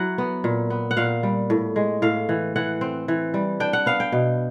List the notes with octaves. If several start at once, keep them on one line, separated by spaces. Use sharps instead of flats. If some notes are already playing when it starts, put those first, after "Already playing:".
Already playing: F#3 E4 F#5
B3
A#2
B3
F#5
A#2 F5
G3
A2
G#3
A2 F5
E3
E3 F#5
C4
E3
G3
D4 G5
F#5
B3 F5
G5
B2